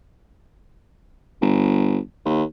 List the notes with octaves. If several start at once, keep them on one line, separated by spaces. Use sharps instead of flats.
G1
D#2